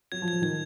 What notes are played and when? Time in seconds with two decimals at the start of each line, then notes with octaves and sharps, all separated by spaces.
0.12 F#3 G#6
0.22 F3
0.28 G#6
0.33 F3
0.42 D#3 G#6